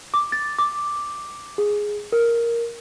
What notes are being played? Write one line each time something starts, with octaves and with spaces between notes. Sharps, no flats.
D6
A6
D6
G#4
A#4